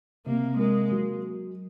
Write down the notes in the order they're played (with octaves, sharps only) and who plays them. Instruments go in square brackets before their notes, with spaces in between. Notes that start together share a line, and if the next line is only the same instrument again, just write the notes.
[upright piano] C3 [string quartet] A#3
[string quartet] G#3 [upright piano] A#3
[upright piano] F#3